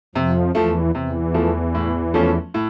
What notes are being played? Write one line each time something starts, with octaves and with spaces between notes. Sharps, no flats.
F2 C3 F3
E2 E3 F3 A3
E2 C3 E3
F3 A3
A2
F3 A3 C#4
A2